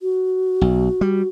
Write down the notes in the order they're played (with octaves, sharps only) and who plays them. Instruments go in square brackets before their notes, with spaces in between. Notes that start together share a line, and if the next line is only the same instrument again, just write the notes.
[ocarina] F#4
[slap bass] B1
G3